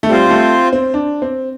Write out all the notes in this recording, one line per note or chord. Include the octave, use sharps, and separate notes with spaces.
A3
G3 C4 F4 C5
G3
A3
C4
D4
C4